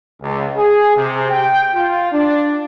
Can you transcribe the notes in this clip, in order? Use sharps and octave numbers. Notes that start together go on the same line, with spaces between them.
C#2
G#4
C3
G5
F4
D4